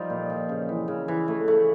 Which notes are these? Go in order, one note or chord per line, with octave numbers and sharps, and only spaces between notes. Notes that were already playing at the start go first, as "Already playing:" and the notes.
Already playing: F3 G3 D#4
A#2
F3
C#3
E3
C#3
E3
A3
A3